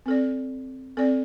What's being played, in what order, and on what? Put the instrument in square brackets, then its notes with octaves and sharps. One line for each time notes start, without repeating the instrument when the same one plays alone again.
[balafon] C4 A4 D5
C4 A4 D5